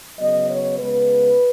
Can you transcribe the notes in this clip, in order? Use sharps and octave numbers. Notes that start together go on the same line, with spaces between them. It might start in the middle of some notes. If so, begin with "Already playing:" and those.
C#3 F#3 B3 D#5
C#5
C#3 G#3 B3 B4